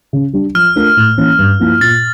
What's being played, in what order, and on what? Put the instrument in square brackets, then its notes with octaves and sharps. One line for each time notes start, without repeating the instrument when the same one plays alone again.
[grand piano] C#3
G3 D4
[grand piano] F3 [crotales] F6
[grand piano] A3 D4 F4 A#4
A2
E3 A#3 C#4
G2
F3 A#3 E4
[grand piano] A#2 [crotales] A6